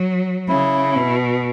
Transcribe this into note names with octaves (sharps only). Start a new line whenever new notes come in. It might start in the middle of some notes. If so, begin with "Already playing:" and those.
Already playing: F#3
C#3 E4
B2